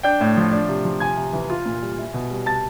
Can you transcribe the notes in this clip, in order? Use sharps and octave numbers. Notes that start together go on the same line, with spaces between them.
D4 G5 G6
A2
F3
D4
C3
F3
C3 G#5 G#6
C3
E3
F4
A#2
G3
E4
B2
G3
C3 A5 A6